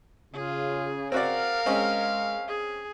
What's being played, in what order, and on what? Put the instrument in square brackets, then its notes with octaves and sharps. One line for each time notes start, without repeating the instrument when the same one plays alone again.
[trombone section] C#3 [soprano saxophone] F4 [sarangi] G#4
[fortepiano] C4 F#4 D5 [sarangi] A#4 [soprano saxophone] F5
[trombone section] G#3 [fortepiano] C4 C#4 D#5
[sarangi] G#4